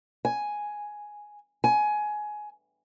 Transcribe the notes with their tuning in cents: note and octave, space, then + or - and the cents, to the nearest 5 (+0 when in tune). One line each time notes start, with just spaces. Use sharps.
G#5 +0
G#5 +20